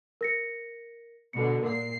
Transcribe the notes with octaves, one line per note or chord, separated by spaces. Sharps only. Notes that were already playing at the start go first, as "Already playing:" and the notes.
A#4 A#6 C#7
B2 D3 C#7
A#2 A#4 C7